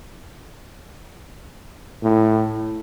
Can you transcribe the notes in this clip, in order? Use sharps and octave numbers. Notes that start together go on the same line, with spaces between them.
A2